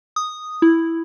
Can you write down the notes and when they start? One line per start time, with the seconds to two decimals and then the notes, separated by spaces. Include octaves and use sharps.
0.16 D#6
0.62 E4